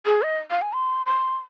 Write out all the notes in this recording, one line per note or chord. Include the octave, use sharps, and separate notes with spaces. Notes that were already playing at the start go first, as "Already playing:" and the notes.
G#4
D#5
F5
G#5
C6
C6